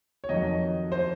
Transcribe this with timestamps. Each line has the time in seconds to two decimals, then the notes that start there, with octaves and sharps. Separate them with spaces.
0.24 C#5
0.29 F2 D#3 F#3 D#5
0.92 C5